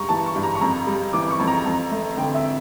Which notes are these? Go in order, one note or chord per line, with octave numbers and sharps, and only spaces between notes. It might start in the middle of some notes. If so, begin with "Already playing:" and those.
Already playing: G2 G3 A#5 C#6
E3 A5
C#6
G2
A#5
C#6
F2 A#5
G3
E3 D6
C#6
F2
A#5
F2 A#5
A3
D3 G5
E5